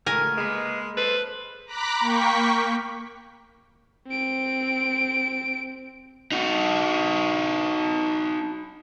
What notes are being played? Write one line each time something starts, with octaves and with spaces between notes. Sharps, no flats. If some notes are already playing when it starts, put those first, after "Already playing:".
C#2 A3 A#4 G#5
G#3 A#3 B4
A4 B4 C5
A#5 B5 D6 F#6 B6
A#3 G5 C#6 B6
C4 D7
D#4 F#4